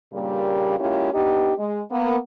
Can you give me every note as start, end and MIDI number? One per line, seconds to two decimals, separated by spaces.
0.13 0.79 43
0.13 0.79 46
0.13 0.79 49
0.13 0.79 55
0.13 0.79 58
0.13 0.79 67
0.79 1.13 56
0.79 1.13 58
0.79 1.13 61
0.79 1.13 64
0.79 1.13 65
0.79 1.13 67
1.13 1.53 59
1.13 1.53 62
1.13 1.53 63
1.13 1.53 67
1.58 1.81 56
1.91 2.17 58
1.91 2.17 59